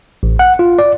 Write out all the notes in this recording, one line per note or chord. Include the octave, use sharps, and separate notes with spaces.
A1
F#5
F4
D5